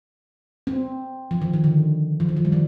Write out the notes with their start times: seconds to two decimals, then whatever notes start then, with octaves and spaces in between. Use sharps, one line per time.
0.67 C4
1.31 F3
1.42 D#3
1.54 D#3
1.64 D3
2.20 F3
2.29 D#3
2.37 F3
2.45 G3
2.52 D#3